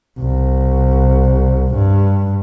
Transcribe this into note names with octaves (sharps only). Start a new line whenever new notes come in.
C2
G2